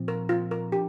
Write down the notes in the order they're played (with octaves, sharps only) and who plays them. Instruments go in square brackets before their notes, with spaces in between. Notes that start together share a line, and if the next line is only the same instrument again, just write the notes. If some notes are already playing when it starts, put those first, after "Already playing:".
Already playing: [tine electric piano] A#2 F3 C4
[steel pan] A#4
F4
A#4
[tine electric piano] F3 D4 [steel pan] G4